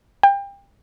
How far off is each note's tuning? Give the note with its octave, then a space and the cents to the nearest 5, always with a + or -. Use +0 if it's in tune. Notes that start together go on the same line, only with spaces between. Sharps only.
G5 +30